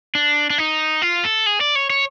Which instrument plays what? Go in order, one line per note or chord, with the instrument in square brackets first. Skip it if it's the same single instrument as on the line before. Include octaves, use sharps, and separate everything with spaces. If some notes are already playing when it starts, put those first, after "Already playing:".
[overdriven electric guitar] D4
D4
D#4
F4
A4
G#4
D5
C#5
C#5